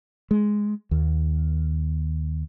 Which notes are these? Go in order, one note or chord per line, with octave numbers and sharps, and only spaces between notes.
G#3
D#2